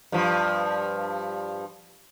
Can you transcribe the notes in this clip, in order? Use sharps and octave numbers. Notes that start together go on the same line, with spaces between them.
G2 F3